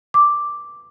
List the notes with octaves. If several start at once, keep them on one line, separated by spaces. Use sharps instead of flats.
D6